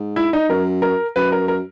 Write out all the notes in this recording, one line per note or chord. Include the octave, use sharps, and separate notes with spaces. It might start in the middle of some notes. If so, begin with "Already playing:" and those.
Already playing: G#2
E4
D#4
F#2 A#4
A#4
F#2 B4
A#4
A#4